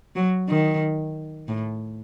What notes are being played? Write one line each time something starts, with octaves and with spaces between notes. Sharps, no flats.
F#3
D#3
A2